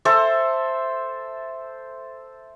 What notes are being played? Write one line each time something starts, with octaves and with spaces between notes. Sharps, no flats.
A4 C5 E5